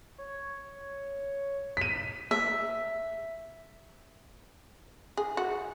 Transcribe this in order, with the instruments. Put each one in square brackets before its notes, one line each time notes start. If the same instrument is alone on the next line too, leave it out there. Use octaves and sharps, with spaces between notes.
[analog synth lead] C#5
[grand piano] B6 D#7
[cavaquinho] E5
[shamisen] G#4
F#4